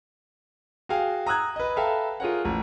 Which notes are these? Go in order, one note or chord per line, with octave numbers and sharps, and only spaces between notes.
F#4 G#4 F5 G5 G#5
A#5 D#6 E6 F#6 G#6
B4 D#5
A4 B4 E5 F5 G5 A#5
F4 G#4 A#4 C#5 F#5
A1